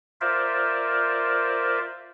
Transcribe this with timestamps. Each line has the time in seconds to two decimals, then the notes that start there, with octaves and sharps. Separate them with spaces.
0.21 F4 A#4 C5 D5 E5